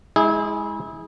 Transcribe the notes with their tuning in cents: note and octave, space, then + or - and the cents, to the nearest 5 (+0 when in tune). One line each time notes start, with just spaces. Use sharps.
G#3 +5 E4 -35 G#4 +0